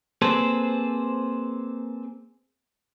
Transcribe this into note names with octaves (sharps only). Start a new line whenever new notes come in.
A#3 C4 G#4 A4 B4 C5